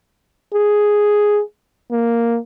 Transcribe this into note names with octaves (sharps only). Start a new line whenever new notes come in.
G#4
A#3